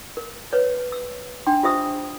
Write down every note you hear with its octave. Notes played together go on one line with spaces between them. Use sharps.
A#4
B4 C#5
E6
D4 G5 C6
F4 G4 C5 E5 D#6 E6